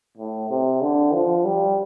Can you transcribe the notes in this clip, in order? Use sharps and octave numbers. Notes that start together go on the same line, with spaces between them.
A2
C3
D3
F3
G3